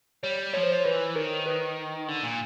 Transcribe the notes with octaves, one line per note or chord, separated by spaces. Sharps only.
G3 C#5
F3 C#5
C5
C#5
E3 B4
D#3 A#4
B4
D3
A#2